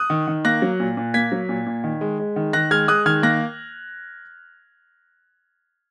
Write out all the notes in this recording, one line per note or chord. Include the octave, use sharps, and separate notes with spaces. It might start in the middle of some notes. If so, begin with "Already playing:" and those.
Already playing: D#6 F#6
D#3
D#3
A#3 F#6 A#6
F#3
A#2
A#2
A#3 G#6 B6
F#3
A#2
A#2
D#3
G#3
G#3
D#3
D#3 F#6 A#6
G#3 F6 G#6
G#3 D#6 F#6
D#3 F6 G#6
A#3 F#6 A#6